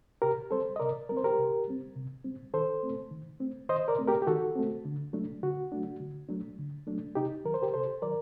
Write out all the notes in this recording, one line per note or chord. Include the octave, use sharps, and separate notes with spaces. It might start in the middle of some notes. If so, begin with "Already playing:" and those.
C3 G4 A#4
G3 C4 A4 C5
D#5
C3 A#4 D5
G3 C4 A#4
C5
G4 A#4
C3
G3 C4
C3
G3 C4
D#3 A4 C5
A3 C4
D#3
A3 C4
D#3 C5 D#5
A#4 D5
A3 C4
G4 A#4
G4
D#3 F#4 A4
A3 C4
D3
F#3 A3 D4
D3 F#4
F#3 A3 D4
D3
F#3 A3 D4
D3
F#3 A3 D4
C3 D#4 G4
D#3 F#3 A#4
C5
G4 A#4
C3 A4 C5
D#3 F#3 A#4 D5